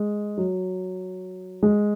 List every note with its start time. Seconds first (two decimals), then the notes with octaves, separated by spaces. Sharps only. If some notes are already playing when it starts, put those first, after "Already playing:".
Already playing: G#3
0.38 F#3
1.63 G#3